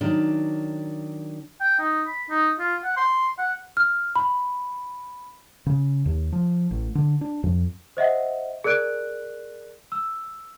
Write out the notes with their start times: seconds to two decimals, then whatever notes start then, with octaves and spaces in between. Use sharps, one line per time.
0.01 D#3 F#3 D4
1.61 G5
1.79 D#4
2.07 B5
2.30 D#4
2.60 F4
2.84 F#5
2.97 C6
3.39 F#5
3.77 F6
4.16 B5
5.66 C#3
6.06 D#2
6.32 F3
6.71 A1
6.95 D3
7.21 D4
7.43 F2
7.97 C5 D#5 E5 F#5
8.64 G#4 A#4 D5 F#6 D7
9.92 E6